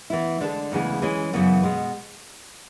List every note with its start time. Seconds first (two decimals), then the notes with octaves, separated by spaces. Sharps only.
0.10 E3 B3 E4
0.40 D3 G#3 D4 A4
0.72 D2 C#3 E3 G#3 B3
1.02 E3 G#3 C#4 G#4
1.33 F#2 C#3 E3 B3
1.63 B2 G#3